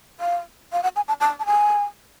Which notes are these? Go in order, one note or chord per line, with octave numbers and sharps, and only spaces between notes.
F5
F5
F#5
G#5
A5
A5
A5
G#5